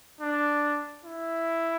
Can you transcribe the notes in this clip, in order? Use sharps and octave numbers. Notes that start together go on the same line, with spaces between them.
D4
E4